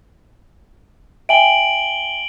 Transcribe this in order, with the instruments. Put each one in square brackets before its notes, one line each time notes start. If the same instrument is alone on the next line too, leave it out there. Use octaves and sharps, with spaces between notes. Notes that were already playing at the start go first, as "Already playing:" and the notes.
[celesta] E5 G5 G#5 [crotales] D7 F#7 G7